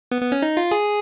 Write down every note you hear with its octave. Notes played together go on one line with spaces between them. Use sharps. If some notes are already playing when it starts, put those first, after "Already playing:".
B3
B3
C#4
D#4
F4
G#4